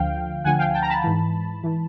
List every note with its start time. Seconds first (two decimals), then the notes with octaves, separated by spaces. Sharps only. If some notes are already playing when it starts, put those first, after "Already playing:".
Already playing: D2 D3 F3 F5 G5
0.44 D2 D3 F3 F#5 G#5
0.59 F5 G5
0.74 G5 A5
0.82 A#5
0.90 A5 B5
1.04 G#2 E3
1.63 E3